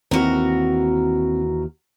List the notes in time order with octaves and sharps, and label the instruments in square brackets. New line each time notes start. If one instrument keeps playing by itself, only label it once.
[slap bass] D#2 E3 [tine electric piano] C4 [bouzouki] F#4 A#4